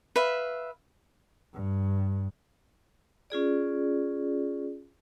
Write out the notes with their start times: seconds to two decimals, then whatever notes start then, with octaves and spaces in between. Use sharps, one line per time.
0.16 B4 E5 F5
1.53 G2
3.30 C#4 F4 G#4 D5